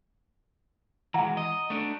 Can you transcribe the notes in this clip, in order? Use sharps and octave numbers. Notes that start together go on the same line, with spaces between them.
E3 G#3 F#5 A#5
D#5
A3 D4